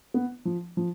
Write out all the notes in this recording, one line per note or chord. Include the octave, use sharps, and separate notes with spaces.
B3
F3
F3